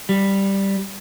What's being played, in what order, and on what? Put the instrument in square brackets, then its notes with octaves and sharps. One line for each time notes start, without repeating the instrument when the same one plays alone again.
[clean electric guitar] G3